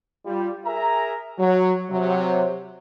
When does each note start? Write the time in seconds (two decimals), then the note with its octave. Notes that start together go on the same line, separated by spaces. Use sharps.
0.25 G3 F4
0.65 G#4 A#4 E5 G#5 A#5
1.39 F#3
1.90 C3 F#3